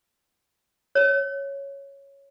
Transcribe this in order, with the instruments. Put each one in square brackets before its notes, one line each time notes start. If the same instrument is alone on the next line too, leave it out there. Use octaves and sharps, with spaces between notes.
[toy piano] C#5